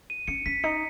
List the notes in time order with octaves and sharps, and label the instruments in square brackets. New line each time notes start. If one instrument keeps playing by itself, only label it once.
[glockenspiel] D#7
[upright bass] C#4 [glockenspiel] C#7
[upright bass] C#4 [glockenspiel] B6
[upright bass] D#4 [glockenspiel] C#7